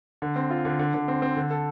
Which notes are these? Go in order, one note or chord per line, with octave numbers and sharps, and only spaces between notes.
D3
C4
F4
D3
D3
D3
C4
C4
D3
A4